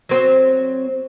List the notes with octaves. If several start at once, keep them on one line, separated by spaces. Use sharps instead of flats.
F#3 C4